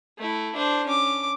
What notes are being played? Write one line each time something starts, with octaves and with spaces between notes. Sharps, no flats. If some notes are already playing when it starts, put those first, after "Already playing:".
A3 E4
D4 C5
C#4 D6